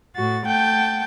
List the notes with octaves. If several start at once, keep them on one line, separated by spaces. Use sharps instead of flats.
A2 F#4 A6
A3 F#5 G5 A5 G6